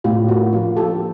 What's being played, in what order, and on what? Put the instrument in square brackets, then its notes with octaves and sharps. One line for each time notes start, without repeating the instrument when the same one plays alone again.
[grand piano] A2 [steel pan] F4 G4
[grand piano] A#3 [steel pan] F#4
[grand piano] F3 [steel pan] F4
[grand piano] F3 [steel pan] G4 A4